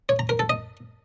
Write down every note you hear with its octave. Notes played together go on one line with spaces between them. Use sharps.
C#5
A#5
A#4
A4
D#5